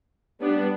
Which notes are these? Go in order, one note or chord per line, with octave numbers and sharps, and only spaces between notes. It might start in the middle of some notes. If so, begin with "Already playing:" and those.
G3 B3 D4